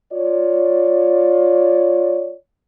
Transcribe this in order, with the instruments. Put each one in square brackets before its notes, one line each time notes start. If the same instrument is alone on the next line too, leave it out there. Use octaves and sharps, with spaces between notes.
[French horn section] F4 C#5 D5